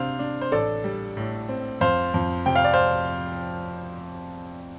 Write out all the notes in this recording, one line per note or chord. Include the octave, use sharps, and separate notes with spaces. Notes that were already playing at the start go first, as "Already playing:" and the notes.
Already playing: C3 D4 C5 F5
D4
C5
A1 A4 D5
G3
A2
C4
F2 C5 F5
F2
C3 G5
F5
D5
C5 F5